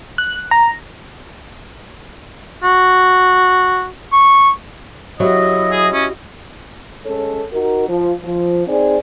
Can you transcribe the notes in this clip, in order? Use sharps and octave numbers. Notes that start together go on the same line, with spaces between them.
F#6
A#5
F#4
C#6
F#3 E4 F#4 G4 D#5
G#4
C#4
G#3 C#4 A4 C#5
D#4 F#4 A#4
F3
F3
C4 D#4 G#4 D5